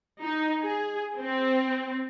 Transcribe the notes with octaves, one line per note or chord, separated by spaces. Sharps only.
D#4
G#4
C4